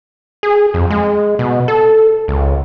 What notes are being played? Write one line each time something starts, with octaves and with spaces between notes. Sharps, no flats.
G#4
F2
G#3
B2
A4
C#2